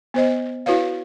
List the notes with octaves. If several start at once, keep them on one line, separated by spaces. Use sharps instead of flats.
B3 C5 D#5
E4 F#4 B4 C#5 F5